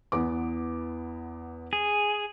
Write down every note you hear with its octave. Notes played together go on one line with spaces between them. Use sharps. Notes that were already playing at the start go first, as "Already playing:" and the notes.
E2 B3 D6
G#4